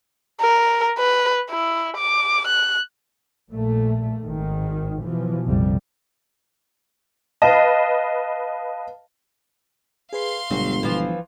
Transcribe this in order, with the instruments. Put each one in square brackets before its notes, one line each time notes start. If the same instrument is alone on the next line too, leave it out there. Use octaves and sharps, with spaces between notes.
[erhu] A#4
B4
E4
D6
F#6
[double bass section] A#1 A#2 A3
G#1 G#2 D#3
B2 E3 F3
A#1 F2 C3 G3
[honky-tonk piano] B4 D#5 [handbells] F5 A5
[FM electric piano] G#4 B4 C7 [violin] F5 C6
[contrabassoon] G1 [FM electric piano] B2 G#3 G4 [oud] F#3
[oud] E3 F3